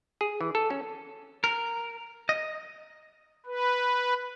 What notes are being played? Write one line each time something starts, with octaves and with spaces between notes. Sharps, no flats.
G#4
E3
A4
C#4
A#4
D#5
B4